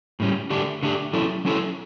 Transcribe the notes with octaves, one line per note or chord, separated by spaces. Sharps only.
A2 G3 C#4
D3 A3 D4 G4
D3 A3 D4 G4
F#3 C#4 E4 A4
F#3 C#4 E4 A4